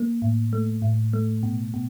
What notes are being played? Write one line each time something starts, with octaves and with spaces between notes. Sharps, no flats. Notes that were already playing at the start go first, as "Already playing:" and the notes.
Already playing: A#3
A2
A3
A2
A3
B2
B2